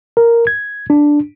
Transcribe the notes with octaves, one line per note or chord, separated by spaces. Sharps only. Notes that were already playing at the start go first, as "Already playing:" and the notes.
A#4
G#6
D4